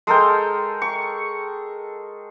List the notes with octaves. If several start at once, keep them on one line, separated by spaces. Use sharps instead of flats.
G#3 A4 A#4 G5
C#6